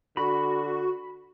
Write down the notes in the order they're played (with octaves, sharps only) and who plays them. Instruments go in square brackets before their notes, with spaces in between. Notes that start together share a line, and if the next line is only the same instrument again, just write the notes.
[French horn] D3 [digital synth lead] F#4 [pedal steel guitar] B5